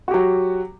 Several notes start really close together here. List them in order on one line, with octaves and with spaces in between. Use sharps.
F#4 G4 F#3